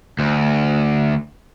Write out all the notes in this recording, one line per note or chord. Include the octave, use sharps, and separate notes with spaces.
D2